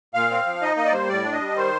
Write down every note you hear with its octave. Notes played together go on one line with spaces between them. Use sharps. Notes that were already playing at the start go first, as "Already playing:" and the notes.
A#2 F5
C4
F3
D#4 D#5
A#3 D#5
D5
G3 C5
A2 D5
D4
D#5
G3
D#3 C5